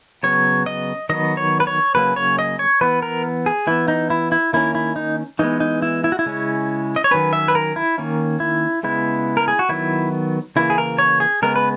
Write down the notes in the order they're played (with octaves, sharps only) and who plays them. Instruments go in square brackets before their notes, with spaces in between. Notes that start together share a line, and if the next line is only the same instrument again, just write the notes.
[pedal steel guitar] C#3 F#3 B3 C#5
D#5
D#3 F#3 B3 D#5
C#5
B4
C#5
C#3 F#3 A#3 C#4 B4
C#5
D#5
C#5
E3 B3 B4
A#4
G#4
E3 B3 E4
D#4
E4
E4
D#3 A#3 C#4 E4
E4
D#4
E3 G#3 B3 D#4
D#4
E4
E4
F#4
E4
C#3 G#3 C#4
D#5
C#5
D#3 F#3 C#4 B4
E5
B4
A#4
E4
D#3 A#3 C#4
E4
C#3 G#3 B3 E4
A#4
G#4
F#4
D#3 F#3 B3 E4
C#3 E3 A#3 E4
G#4
A#4
C#5
G#4
C#3 G#3 B3 A#4
B4